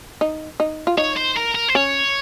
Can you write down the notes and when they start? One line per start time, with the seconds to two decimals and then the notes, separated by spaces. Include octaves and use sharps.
0.21 D#4
0.60 D#4
0.87 F4
0.97 D#4 C#5
1.17 C5
1.37 A#4
1.55 A#4
1.69 C5
1.75 C#4 C#5